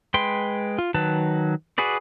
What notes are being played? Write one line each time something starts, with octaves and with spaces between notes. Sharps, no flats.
G#3 B4 G5 C6
F4
D#3 F#3 B4 A5
F#4 G#4 B4 D5